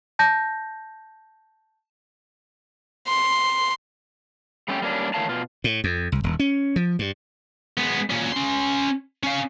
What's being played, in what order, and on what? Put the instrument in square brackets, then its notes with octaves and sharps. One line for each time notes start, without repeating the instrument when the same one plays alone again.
[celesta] A5 G6 A#6
[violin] C6
[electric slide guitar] G3 A3 C#4 D4 G4
G3 A#3 C#4 D4
D#3 E3 A3 C#5 F5 A5
B2 F4
[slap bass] A2
F2
C2
D#1
C#4
F3
G2
[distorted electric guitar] G#3 B3
A#2 C#4
C#4 C6
C#4 F5